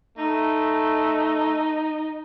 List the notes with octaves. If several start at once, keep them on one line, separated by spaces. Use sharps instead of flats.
A3 D#4